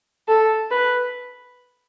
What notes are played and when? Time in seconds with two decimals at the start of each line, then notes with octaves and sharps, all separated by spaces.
0.28 A4
0.71 B4